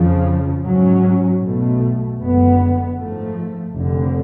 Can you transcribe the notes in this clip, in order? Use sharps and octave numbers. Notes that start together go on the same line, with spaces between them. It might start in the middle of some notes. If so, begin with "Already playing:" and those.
Already playing: F2 C#3 F3
G#2 F#3 C#4
B1 B2 A3
F#1 F#2 D3 G#3 B3
G#2 F3 A3
F1 F2 D3